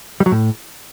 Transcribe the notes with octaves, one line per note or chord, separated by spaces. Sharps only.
G3
F#3
A2